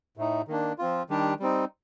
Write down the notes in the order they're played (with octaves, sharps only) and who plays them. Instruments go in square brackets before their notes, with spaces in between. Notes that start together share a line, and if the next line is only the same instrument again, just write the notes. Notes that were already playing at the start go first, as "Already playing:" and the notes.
[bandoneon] A2 A3 D#4
D#3 A#3 D4
F3 C4 F4
D#3 G3 D4 G4
G3 C4 D#4